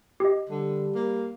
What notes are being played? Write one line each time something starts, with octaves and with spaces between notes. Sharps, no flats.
G4 D#5
D3 G3
A#3